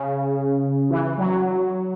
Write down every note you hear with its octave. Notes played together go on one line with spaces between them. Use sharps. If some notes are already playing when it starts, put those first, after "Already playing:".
Already playing: C#3
E3
F#3